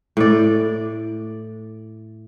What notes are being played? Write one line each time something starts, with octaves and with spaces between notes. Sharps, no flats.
A2 D5